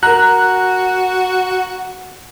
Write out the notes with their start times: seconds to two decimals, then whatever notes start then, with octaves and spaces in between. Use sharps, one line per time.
0.03 F#4 A#4 A#5 F#6